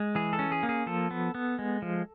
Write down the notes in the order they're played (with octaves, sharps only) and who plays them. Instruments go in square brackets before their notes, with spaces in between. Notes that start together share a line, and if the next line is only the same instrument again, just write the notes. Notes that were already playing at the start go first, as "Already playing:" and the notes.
Already playing: [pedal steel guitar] G#3
E3 G#4
A4
C#4
G#4
A#3
G#4
F3 A4
B3
B3
G#3
F3